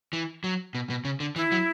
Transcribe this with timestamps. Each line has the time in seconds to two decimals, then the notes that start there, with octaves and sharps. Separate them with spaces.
0.13 E3
0.44 F#3
0.75 B2
0.90 B2
1.05 C#3
1.20 D3
1.36 E3 E4
1.52 F#3